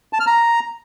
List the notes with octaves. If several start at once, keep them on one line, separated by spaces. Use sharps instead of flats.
A5
F6
A#5